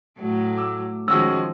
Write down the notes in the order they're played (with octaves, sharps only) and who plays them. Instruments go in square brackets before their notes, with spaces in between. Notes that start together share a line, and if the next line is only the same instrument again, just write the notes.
[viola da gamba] A2 F#3 A3
[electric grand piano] D6 E6
[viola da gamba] D#3 F3 G#3 [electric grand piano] C#4 F#4 G#4 [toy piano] E6